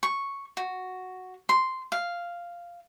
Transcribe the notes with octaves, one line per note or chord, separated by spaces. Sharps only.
C#6
F#4
C6
F5